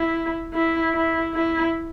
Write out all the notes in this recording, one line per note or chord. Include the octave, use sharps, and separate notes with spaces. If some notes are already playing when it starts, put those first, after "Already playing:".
Already playing: E4
E4
E4
E4